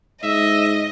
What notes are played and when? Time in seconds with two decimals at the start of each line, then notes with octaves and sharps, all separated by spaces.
0.23 G#2 D#5 E5